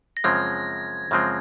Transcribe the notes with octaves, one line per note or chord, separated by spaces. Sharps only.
A#6
F#2 C#3 F3 G#3 C4 G#6
F#2 C#3 F3 G#3 C4